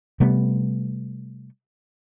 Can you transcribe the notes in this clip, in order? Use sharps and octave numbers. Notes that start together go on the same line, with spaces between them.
C3 G3 A3 B3